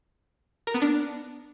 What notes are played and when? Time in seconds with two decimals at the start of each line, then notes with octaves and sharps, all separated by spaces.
0.67 A#4
0.74 B3
0.82 D4